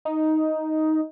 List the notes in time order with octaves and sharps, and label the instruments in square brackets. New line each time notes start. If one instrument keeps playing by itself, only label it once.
[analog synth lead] D#4